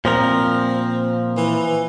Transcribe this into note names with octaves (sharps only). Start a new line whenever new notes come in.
A#2 F3 C4 A#4
E3